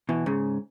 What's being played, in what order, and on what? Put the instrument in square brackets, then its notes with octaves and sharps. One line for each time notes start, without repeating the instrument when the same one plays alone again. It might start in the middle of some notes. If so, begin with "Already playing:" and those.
[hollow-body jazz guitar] B2 E3
G#2 C#3